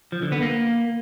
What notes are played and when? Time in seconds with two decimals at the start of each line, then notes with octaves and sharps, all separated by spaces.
0.12 F3
0.22 D3
0.32 B3
0.42 A#3